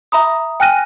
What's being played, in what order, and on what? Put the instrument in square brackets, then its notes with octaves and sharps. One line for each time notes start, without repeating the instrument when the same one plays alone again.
[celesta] E5 A#5 B5 D#6
G5 G#5 F6 F#6 A#6 D#7